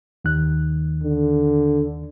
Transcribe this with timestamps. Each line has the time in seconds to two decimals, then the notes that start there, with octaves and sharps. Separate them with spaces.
0.25 D#2 D#3 F#6
1.03 D3